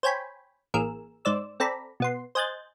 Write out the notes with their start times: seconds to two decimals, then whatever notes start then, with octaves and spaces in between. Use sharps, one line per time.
0.03 C5 C#5 G5 G#5 B5
0.74 A1 A#3 G#4 A#4 E6
1.25 G#2 C5 D5 E6
1.60 C4 A4 D5 A#5 B5
2.00 B2 B3 C6
2.35 C5 D#5 G#5 F#6 G6 A6